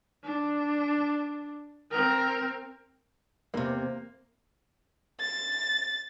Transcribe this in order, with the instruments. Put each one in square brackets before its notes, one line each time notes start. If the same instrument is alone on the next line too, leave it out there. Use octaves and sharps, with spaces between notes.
[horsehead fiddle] D4
C4 A#4
[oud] E2 C3 [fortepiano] A#3
[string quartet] A6